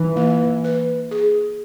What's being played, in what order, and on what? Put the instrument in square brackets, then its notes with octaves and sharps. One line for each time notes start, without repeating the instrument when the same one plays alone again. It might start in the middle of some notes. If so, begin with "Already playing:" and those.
Already playing: [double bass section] E3 [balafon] D#4
[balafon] A#3
B4
G#4